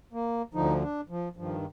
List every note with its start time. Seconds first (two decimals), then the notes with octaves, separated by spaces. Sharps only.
0.13 A#3
0.54 D2 D3 F3 D#4
0.82 D4
1.09 F3
1.37 G2 D#3 F3